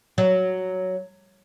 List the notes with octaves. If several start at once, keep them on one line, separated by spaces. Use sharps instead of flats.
F#3